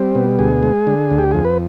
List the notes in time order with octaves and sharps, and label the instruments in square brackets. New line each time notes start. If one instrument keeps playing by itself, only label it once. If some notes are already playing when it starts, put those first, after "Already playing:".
Already playing: [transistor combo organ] G3 C4
B2
D2 G#4
G#3
D3
D2
G4
F2 G#4
B4